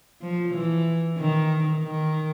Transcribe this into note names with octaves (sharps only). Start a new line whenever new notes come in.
F3
E3
D#3
D#3